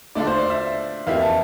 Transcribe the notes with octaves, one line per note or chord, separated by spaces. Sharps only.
D3 A3 D4 F4 D5
C5
D5
E5
F2 E3 A#3 E4 G4 F5
A5